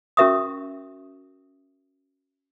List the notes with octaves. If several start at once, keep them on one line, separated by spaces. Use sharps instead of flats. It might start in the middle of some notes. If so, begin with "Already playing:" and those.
C#4 F#4 A#4 E5 C#6 D#6